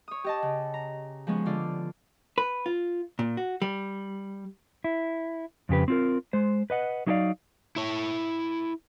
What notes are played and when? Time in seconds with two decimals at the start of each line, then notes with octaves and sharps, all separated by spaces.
0.08 C#5 D#6
0.24 G4 D#5 A5
0.42 C#3
0.74 A#5
1.27 F3 G#3 B3 C#4
1.46 D3 F4 D5
2.38 B4
2.66 F4
3.19 A#2
3.37 F#4
3.62 G3
4.84 E4
5.69 F2 C#3 G4 B4
5.88 C4 F4 A#4
6.33 G#3 C5
6.70 B4 D#5 F#5
7.07 F#3 D#4 E4 A4 D5 F5
7.76 E4 C#5